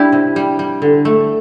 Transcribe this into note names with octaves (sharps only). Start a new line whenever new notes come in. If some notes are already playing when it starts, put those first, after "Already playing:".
Already playing: G3 D4 E4 G4
C3
G3
G3
D3
A3